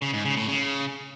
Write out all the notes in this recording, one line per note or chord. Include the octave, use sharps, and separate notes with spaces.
C#3
G#2
C#3
A2
C#3